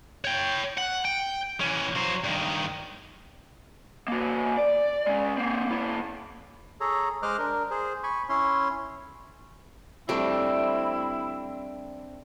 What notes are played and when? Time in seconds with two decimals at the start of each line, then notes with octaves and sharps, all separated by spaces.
0.25 C#5 G5
0.78 F#5
1.05 G5
1.60 E3 C#4
1.96 F#3 C5
2.24 G2 D#3
4.08 A#3 F#4
4.57 D5
5.07 G#3 C#4
5.38 A#3 C4
5.67 A#3 E4
6.81 G#4 A4 C#5 A#5
7.23 G#3 C5 D#5 D6 F6 F#6
7.38 D4 A#4
7.71 G#4 C5
8.03 G#5 B5 C#6
8.29 C#4 E4 C#5 C6
10.09 G3 A3 C4 D4 E4